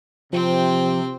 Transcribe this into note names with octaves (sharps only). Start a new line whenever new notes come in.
C3 F3 C4 G5